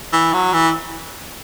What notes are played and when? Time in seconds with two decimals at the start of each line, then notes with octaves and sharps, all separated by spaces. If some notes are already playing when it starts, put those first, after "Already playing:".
0.13 E3
0.34 F#3
0.53 E3